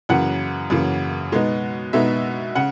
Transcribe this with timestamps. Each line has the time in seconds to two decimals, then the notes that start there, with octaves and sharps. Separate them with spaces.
0.09 F#2 C#3 E3 A#3 F#5
0.70 F#2 C#3 E3 A#3
1.32 B2 G#3 B3 D#4
1.93 B2 G#3 B3 D#4 E5
2.55 C#3 F#5